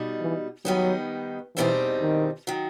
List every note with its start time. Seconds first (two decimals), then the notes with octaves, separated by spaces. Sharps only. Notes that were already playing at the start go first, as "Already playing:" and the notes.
Already playing: B2 G3 D#4
0.20 E3
0.65 D#3 F#3 G3 B3 D#4
1.56 E2 B2 E3 G3 C4 D#4
2.01 D#3
2.47 D#3 F#3